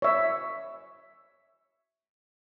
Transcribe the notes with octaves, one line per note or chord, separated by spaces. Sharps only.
C#5 E5